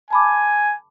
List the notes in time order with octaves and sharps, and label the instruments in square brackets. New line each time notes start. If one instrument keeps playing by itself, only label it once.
[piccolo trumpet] G#5 [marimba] A5 B5 D6